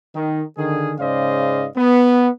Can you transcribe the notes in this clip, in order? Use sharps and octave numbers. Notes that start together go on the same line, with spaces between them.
D#3
D3 D#3 G#4
G#2 C#3 C5 D5 D#5 F5
B3